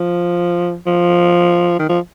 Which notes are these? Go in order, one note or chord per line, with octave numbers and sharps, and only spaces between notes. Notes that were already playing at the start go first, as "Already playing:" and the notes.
Already playing: F3
F3
D#3
F3